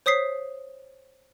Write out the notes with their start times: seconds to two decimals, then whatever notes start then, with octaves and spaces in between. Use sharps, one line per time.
0.06 C5 C#5 D#6 B6 C7